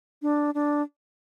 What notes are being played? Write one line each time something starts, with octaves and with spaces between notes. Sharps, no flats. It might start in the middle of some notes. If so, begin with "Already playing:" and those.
D4
D4